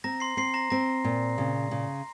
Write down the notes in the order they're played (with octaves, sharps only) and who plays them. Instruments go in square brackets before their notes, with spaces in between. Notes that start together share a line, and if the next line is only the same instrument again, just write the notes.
[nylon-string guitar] C4 [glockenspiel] A#5 A#6
[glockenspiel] C6 C7
[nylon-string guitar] C4 [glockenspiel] C6 C7
[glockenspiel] A#5 A#6
[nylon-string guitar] C4 [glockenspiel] A#5 A#6
[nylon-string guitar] A#2
C#3
C#3